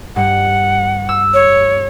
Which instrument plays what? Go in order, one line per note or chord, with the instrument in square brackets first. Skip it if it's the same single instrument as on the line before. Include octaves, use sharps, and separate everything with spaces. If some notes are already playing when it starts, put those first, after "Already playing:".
[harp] G2 [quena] F#5
[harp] E6
[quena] C#5